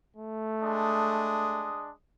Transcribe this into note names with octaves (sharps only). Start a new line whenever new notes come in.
A3
G#3 D4 D#6